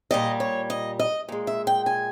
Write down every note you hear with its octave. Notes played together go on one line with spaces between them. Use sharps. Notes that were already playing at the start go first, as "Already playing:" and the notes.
A#2 G3 D#5
C#5
D#5
D#5
A#2 G#3
E5
G5
G#5